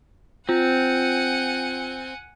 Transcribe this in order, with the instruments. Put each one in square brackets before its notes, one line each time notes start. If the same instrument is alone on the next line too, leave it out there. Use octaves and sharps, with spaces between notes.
[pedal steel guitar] C4 [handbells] F4 [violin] F#5 G#5